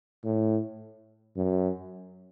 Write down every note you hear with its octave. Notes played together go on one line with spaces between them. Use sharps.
A2
F#2